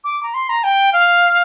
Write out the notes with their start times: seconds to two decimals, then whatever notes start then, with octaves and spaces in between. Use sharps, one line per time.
0.04 D6
0.23 A#5
0.34 C6
0.49 A#5
0.63 G5
0.92 F5